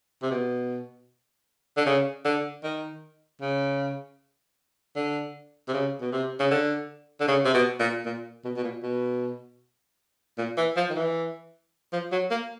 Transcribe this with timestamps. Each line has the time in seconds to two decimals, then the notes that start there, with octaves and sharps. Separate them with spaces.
0.23 C3
0.31 B2
1.77 D3
1.86 C#3
2.25 D3
2.63 D#3
3.41 C#3
4.96 D3
5.68 C3
5.73 C#3
6.01 B2
6.12 C3
6.40 C#3
6.51 D3
7.20 D3
7.28 C#3
7.45 C3
7.54 B2
7.80 A#2
8.06 A#2
8.45 B2
8.57 B2
8.64 A#2
8.83 B2
10.38 A#2
10.57 E3
10.77 F3
10.90 D#3
10.96 E3
11.93 F3
12.12 F#3
12.31 A#3